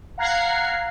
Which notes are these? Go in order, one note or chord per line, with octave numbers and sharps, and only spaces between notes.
F5 F#5 A#5 F#6 G#6 C7